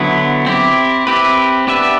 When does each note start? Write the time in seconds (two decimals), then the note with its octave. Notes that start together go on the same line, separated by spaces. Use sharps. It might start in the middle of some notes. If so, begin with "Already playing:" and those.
Already playing: D3 F#3 B3 E4
0.46 C4 E4 G4
1.07 C4 E4 G4 B4
1.67 B3 D4 G4 B4 E5